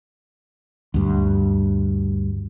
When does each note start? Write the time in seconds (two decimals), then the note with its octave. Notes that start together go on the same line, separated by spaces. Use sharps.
0.94 D2 G2